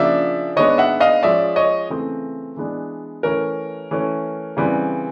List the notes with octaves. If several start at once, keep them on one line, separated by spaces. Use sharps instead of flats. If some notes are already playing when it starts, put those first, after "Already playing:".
Already playing: C#3 F3 A#3 D4 D5 E5
D#3 G#3 B3 D4 C#5 D#5
E5 F#5
D#5 F5
F3 G#3 C#4 D5 E5
C#5 D#5
C#3 E3 A3 C4
E3 G#3 B3 D4
E3 A3 C#4 A#4
E3 A3 C#4
C#3 E3 G3 C4